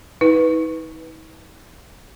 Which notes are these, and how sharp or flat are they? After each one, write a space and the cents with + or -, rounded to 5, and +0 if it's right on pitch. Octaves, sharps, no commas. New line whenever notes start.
D#4 +45 B4 +0